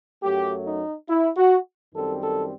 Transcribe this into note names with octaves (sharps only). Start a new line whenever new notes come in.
F#2 F#3 A3 G4
D#4
E4
F#4
F#2 D#3 G3 C4 A4
A4